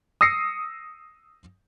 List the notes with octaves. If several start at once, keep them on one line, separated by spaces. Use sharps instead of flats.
D#6 E6 A#6 C7 C#7